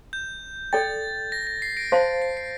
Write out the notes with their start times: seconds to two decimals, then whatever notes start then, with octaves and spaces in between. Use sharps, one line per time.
0.13 G6
0.73 A4 D5 G5 A6
1.32 A#6
1.47 A#6
1.62 C7
1.77 A#6 D7
1.92 C5 F5 A5 C6
2.22 C7
2.37 C7